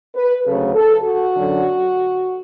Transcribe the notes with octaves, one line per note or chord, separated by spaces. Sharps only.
B4
D2 C#3 F#3 A4
A4
F#4
F#2 D3 F#3